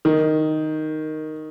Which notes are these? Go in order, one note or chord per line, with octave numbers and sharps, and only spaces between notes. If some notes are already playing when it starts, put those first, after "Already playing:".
D#3